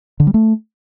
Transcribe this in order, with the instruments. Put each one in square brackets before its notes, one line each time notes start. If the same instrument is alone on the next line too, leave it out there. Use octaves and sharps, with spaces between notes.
[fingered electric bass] D3
G3
A3